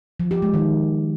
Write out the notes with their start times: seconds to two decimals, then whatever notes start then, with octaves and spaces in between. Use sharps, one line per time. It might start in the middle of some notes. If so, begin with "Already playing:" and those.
0.20 F3
0.31 G4
0.42 G#3
0.54 D#3